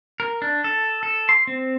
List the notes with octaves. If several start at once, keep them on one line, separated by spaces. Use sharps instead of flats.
A#4
D4
A4
A4
C6
C4